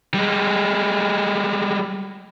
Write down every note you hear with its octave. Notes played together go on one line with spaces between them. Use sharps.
G3 G#3